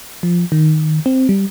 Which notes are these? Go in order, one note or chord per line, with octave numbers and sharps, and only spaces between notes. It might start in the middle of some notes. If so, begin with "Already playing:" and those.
F3
D#3
C4
G3